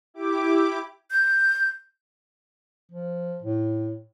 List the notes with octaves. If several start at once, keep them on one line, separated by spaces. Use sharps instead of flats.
E4 G4 D6
G6
F3
A2